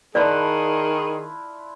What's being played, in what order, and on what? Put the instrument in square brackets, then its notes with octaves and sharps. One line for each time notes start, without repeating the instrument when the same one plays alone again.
[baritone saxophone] D#3 [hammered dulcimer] D4 E4 F4 [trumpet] G#4 [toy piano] D5